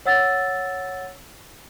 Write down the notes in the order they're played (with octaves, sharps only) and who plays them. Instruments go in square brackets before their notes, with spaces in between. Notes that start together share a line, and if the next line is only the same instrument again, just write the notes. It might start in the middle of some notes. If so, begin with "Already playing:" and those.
[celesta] C#5 F#5 E6 A6